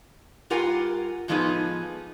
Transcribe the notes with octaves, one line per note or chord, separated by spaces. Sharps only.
G2 F4 G4 A#4 F#5 G#5
A2 F3 G#3 B3 D#4 G#4